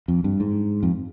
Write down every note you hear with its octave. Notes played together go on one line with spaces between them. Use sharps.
F2
G2
G#2
F2